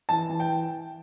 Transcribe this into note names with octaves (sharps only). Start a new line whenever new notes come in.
E3 A5
E3
G5